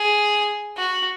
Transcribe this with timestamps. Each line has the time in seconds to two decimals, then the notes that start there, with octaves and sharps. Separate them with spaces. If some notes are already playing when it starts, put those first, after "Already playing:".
Already playing: G#4
0.77 F#4